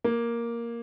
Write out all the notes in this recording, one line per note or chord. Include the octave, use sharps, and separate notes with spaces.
A#3